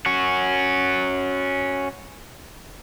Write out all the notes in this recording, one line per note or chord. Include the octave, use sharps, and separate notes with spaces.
C#4 F#4